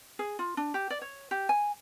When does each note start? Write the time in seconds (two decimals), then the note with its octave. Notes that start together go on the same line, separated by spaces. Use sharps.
0.19 G#4
0.39 F4
0.57 D4
0.74 G4
0.90 D5
1.02 C#5
1.31 G4
1.49 G#5